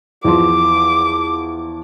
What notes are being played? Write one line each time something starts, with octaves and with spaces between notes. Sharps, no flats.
E2 F3 C6 D6